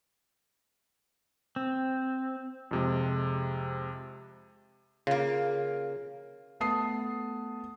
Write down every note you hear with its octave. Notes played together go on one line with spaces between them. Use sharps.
C4
F2 C3 G#3
C#3 A#3 F4
A3 B3 A5 D#6 C7